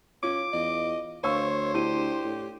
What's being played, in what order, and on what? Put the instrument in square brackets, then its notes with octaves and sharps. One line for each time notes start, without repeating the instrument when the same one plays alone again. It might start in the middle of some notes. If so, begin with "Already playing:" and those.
[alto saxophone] C#4 [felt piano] F4 [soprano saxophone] D6
[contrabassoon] E2 [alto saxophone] D#5
[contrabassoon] D2 [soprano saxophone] C5 [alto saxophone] C#5 [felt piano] F5 C#6 E6
[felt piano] D4 E4 D#7 [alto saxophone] G4
[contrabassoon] A2